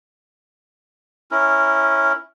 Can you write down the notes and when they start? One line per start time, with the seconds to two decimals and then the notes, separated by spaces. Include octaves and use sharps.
1.31 C#4 E4 A#4